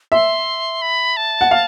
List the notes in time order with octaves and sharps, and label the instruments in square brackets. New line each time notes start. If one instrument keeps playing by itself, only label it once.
[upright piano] E5 [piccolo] C6
[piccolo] B5
A5
[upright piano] F#5
F5